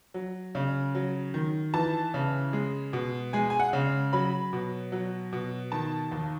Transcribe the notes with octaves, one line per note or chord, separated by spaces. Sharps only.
F#3
C#3
F#3
D#3
E3 A5
C#3
G#3
B2
G#3 G#5
G#5
F#5
C#3
F#3 B5
B2
F#3
B2
D#3 A5
D#2